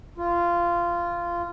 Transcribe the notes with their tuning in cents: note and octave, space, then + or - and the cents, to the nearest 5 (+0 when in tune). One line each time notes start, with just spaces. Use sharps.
F4 -15